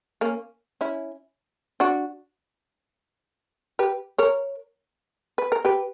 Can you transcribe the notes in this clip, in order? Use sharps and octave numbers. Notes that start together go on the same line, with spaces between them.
A#3 C#4
C#4 E4
D4 F#4
G4 B4
A#4 C#5
B4
A#4
G4 B4